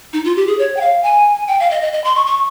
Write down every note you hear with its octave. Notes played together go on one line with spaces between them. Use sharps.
D#4
F4
G4
G#4
C#5
G5
F5
G#5
G5
F5
D#5
D#5
D#5
C6
C#6
C#6